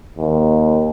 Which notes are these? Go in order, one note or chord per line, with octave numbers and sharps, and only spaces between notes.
D#2